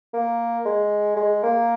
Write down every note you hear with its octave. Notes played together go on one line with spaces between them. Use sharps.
A#3
G#3
G#3
A#3